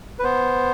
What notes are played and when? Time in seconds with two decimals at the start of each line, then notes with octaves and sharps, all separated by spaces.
0.19 B4
0.24 B3 C5